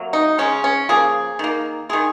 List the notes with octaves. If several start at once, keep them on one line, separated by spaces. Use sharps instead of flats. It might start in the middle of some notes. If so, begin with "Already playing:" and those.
Already playing: C3 F#3 A#3
D#4
C#3 G#3 C#4
C#4
C#3 F3 A#3 G#4
D#3 A#3
D#3 G#3 G#4